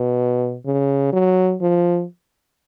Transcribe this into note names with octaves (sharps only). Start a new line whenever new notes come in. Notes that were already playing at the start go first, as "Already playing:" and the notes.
Already playing: B2
C#3
F#3
F3